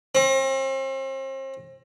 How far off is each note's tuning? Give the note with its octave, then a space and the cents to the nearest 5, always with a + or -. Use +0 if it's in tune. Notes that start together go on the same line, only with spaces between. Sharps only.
C4 +40